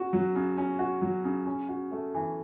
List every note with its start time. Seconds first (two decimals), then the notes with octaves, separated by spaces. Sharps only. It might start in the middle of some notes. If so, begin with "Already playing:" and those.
Already playing: C#3 C#4 F#4
0.13 F#3
0.35 C#3
0.57 C#4
0.79 F#4
1.02 F#3
1.24 C#3
1.46 C#4
1.69 F#4
1.91 A3
2.14 E3